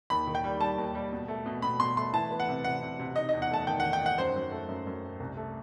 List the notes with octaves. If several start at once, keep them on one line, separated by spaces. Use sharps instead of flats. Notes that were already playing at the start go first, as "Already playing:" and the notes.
D#2 B5
D#3
G5
G3
G3 A5
D#2
G3
B2
A3
B2
B2 B5
B2 C6
A3 C6
E3 A5
B3
F#5
C3
C3 F#5
C3
C3
D#4 D#5
D#5
E2
F#5
A3 A5
D#3 G5
D#3 F#5
G5
D#4 F#5
F#2 C5
F#2
A3
F#2
F#2
A3
C2
A3